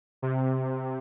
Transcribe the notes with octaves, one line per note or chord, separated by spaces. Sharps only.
C3